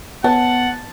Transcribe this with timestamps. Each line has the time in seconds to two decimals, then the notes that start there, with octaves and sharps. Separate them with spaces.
0.24 B3 F#5 A5